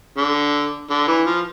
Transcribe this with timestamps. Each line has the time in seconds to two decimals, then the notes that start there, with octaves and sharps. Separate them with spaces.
0.17 D3
0.91 D3
1.08 E3
1.27 F3